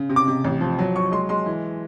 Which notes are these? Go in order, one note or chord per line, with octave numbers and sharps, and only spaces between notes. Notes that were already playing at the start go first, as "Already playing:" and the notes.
Already playing: C#3
C3
D6
C3
A1
F3
F#3
F#3 C#6
G#3 C6
G#3 C6
E3